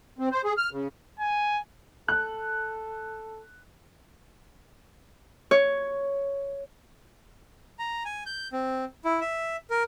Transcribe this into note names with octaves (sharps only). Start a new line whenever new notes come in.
C4
C5
G#4
F6
C#3
G#5
A4 F#6
C#5
A#5
G#5
G6
C4
E4
E5
A#4